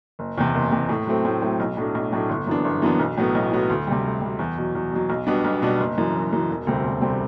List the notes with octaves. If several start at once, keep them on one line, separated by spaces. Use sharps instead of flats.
F#1
E2 C3
F#1
E2 C3
A2
F#3 A3 C4
A2
F#3 A3 C4
B1
A2 F#3 A3 D4
B1
A2 F#3 A3 D4
G1
F#2 E3 B3 D4
G1
F#2 E3 B3 D4
B1
A2 F#3 B3
B1
A2 F#3 B3
D2
C3 G3
D2
C3 G3
E2
B2 F#3
E2
B2 F#3
B1
B2 G3 B3 D4
B1
B2 G3 B3 D4
F#1
F#2 E3
F#1
F#2 E3
E1
D2 C3 G3 C4
E1
D2 C3 G3 C4